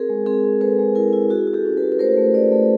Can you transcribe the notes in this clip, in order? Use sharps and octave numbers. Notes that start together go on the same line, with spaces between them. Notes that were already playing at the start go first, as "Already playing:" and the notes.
Already playing: C4 G#4 A#4
G#3
C4 G#4 A#4
C4
G#3 A4 B4
G#3
E4 G#4 A#4
E4
F#4 G#4
F#4
G4 A4
C#4
A4 B4
F#4
B4
A3 A#4 C5
A3
C#4 C5 D5
A3